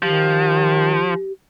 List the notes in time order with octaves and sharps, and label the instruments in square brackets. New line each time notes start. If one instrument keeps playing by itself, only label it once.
[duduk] D#3 [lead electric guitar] F3 [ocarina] G4